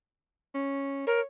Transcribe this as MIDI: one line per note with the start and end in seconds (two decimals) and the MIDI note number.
0.55 1.04 61
1.07 1.20 70
1.07 1.24 73